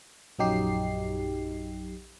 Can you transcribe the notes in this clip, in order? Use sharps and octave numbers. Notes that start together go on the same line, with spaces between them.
A#1 F#2 F#3 D#4 G4 C7